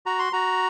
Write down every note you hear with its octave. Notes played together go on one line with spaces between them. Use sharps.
F#4 A#5
C6
F#4 A#5